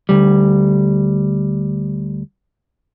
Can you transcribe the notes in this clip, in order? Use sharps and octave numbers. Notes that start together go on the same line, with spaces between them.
D2 G3